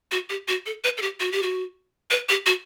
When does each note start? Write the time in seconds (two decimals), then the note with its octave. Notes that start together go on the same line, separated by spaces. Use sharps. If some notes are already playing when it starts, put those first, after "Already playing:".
0.11 F#4
0.29 G4
0.48 F#4
0.66 A4
0.84 B4
0.97 A4
1.02 G4
1.20 F#4
1.32 G4
1.43 F#4
2.10 B4
2.29 G4
2.46 F#4